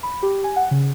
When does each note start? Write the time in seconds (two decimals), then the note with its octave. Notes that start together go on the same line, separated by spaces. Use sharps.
0.03 B5
0.22 G4
0.44 G#5
0.56 F#5
0.71 C#3